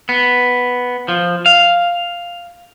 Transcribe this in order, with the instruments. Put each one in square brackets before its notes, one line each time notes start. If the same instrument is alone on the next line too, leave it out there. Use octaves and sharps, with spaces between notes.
[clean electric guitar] B3
F3
F5